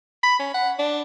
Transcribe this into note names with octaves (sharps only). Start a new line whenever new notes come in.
B5
C#4
F#5
D4